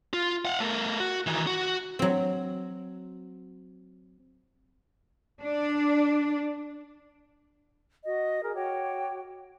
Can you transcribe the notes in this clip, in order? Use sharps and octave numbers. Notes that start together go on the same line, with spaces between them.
F4
F5 F#5
A3 A#4
F#4
D#3 E3
F#4
F#3 C4
D4
F#4 D#5
G#4 A#4
F#4 C#5 G5 D6